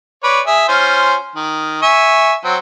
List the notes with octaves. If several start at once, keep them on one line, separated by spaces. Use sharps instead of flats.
B4 C#5 D5
G#4 E5
C#4 F4 C5
D#3
E5 G#5 C#6
F#3 C4